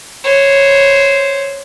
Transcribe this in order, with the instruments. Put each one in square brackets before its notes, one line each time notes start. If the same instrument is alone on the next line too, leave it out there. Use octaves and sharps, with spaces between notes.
[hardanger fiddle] C5 C#5